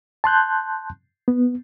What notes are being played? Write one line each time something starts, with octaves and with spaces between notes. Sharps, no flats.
A5 C6 F#6 G6
B3